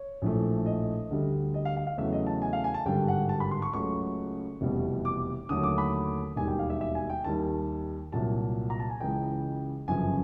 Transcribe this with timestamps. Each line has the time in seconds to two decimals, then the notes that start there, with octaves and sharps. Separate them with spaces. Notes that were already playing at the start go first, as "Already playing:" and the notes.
Already playing: C#5
0.22 A#1 A2 F3 A3
0.66 D#5
1.10 D2 D3 G3
1.54 D#5
1.65 F5
1.76 F5
1.87 F5
1.97 E2 C#3 F#3 A3 E5
2.13 D#5
2.27 A5
2.42 G#5
2.53 F5
2.64 G#5
2.74 A5
2.86 G#1 G2 D3 G3 G5
3.08 F#5
3.29 A5
3.40 B5
3.51 C6
3.62 C#6
3.73 C#2 C#3 F#3 A3 C#6
4.61 F1 E2 B2 G3
5.05 D6
5.49 D#2 D3 F#3 A3 D#6
5.63 D6
5.78 B5
6.36 E1 D#2 D#3 G3 G#5
6.48 G5
6.59 F5
6.70 E5
6.81 E5
6.95 G#5
7.10 G5
7.24 D#2 D#3 G3 A5
8.12 C2 A#2 F#3 A5
8.70 A#5
8.80 A5
8.90 G#5
9.00 C#2 C#3 E3 G#3 G5
9.88 G1 F#2 C#3 F3 G#5